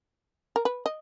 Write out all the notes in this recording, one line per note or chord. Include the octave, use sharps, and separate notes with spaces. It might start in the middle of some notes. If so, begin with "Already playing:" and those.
A#4
B4
D#5